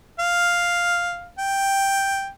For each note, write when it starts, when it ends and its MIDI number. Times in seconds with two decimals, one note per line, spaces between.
0.20 1.29 77
1.38 2.28 79